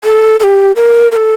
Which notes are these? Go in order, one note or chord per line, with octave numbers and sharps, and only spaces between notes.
A4
A4
G4
A#4
A#4
A4